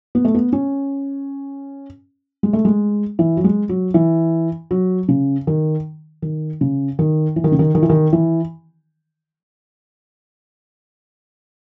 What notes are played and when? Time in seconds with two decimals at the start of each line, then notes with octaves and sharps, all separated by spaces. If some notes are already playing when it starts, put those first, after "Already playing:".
0.15 B3
0.25 A3
0.34 B3
0.53 C#4
2.43 G#3
2.53 A3
2.65 G#3
3.19 E3
3.37 F#3
3.44 G#3
3.69 F#3
3.94 E3
4.71 F#3
5.09 C#3
5.47 D#3
6.22 D#3
6.61 C#3
6.99 D#3
7.36 E3
7.44 D#3
7.52 C#3
7.59 D#3
7.75 D#3
7.83 E3
7.89 D#3
8.13 E3